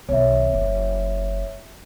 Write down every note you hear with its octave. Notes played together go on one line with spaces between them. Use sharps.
B1 D#3 C#5 E5
F#1